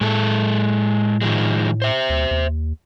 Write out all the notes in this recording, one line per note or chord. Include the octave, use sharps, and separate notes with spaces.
A2 G#3 A4
D#3 F3 G#3
C5 E5
D2
D#2